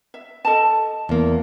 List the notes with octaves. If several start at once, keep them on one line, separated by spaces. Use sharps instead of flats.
E5
A4 D#5 A5
E2 A#3